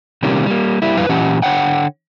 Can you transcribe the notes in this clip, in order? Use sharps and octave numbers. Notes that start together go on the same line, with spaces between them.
C3 D#3 G3 A#3 C#4
G3 A#3
G3 A#3 E4
F2 G3 E4 B4 F5
A#2 E3 C#4 G4 F#5
D3 C#5 F#5 G5